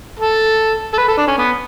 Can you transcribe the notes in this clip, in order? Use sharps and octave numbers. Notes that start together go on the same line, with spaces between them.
A4
A4
B4
A4
D4
C#4
B3